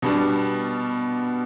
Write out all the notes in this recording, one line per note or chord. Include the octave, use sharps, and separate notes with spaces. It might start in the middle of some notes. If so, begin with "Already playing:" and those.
B2 G3 B3 D4